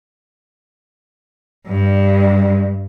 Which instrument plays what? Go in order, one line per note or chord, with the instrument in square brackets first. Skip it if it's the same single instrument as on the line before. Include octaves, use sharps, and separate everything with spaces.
[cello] G2 [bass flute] G3